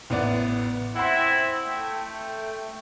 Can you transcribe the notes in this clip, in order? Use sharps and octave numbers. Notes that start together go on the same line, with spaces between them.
A1 B3 D5
C4 E4 F#5 C6
A3 G5